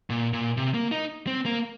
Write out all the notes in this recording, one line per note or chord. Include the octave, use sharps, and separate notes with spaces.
A#2
A#2
C3
A#3
D#4
C4
A#3